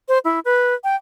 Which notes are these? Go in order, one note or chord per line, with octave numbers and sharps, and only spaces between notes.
C5
E4
B4
G5